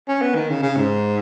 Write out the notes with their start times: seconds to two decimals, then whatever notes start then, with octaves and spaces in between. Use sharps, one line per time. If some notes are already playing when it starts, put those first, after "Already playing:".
0.08 C#4
0.22 B3
0.35 D#3
0.50 C#3
0.62 C#3
0.77 G#2